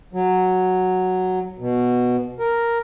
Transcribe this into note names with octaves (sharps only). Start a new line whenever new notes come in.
F#3
B2
A#4